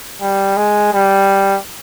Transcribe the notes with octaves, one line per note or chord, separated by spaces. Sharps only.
G3
G#3
G3